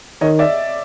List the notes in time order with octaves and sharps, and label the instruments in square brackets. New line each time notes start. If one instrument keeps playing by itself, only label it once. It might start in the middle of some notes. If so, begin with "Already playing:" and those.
[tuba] D#3 [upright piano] C#5 D#5
[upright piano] D5 E5